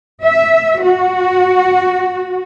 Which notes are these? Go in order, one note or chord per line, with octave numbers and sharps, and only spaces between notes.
E5
F#4